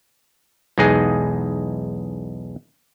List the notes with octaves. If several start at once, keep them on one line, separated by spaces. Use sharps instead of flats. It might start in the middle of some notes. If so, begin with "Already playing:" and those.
B1 E2 G#3 D#4 G#4